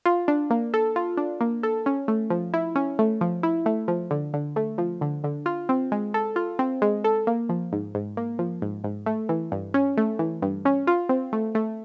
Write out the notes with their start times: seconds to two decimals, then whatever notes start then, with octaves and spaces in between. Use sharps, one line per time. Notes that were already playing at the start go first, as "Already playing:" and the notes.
0.06 F4
0.28 D4
0.50 A#3
0.74 A4
0.96 F4
1.17 D4
1.41 A#3
1.63 A4
1.86 C#4
2.08 A3
2.30 F3
2.54 E4
2.76 C#4
2.99 A3
3.21 F3
3.43 E4
3.66 A3
3.88 F3
4.11 D3
4.34 D3
4.56 A3
4.78 F3
5.01 D3
5.24 D3
5.46 F4
5.69 C4
5.92 G#3
6.14 A4
6.36 F4
6.59 C4
6.82 G#3
7.04 A4
7.27 A#3
7.49 F3
7.72 G#2
7.95 G#2
8.17 A#3
8.39 F3
8.62 G#2
8.84 G#2
9.06 A3
9.29 E3
9.52 G2
9.74 C#4
9.98 A3
10.19 E3
10.42 G2
10.65 C#4
10.87 F4
11.09 C4
11.33 A3
11.55 A3